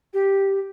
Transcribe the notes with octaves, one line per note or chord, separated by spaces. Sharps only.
G4